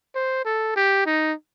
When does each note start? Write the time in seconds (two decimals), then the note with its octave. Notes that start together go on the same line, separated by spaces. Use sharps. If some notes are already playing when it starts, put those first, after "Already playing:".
0.15 C5
0.45 A4
0.76 G4
1.06 D#4